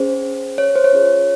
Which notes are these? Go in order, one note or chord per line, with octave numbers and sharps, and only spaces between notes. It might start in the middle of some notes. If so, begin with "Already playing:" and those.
Already playing: C#4 G#4 C5
C#5
C5
C#5
C#4 F4 G#4